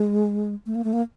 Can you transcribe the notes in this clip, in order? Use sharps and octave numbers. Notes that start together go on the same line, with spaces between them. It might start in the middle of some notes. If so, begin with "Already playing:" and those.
Already playing: G#3
A3
A#3
A3
A#3